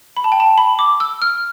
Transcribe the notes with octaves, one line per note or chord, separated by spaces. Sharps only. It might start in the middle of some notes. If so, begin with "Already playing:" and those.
B5
A5
G5
A5
B5
D6
E6
F6